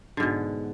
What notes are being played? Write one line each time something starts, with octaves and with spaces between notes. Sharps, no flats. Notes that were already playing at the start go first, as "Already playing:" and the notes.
G#2 B2 D3